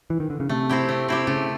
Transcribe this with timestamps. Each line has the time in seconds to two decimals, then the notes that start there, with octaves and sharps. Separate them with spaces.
0.10 E3
0.20 D#3
0.30 D3
0.40 C#3
0.49 C3 A3
0.69 C4 E4 G4
0.89 A3
1.08 C4 E4 G4
1.27 C#3 A3